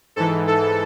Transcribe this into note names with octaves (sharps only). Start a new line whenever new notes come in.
G#2 E3 A4
A4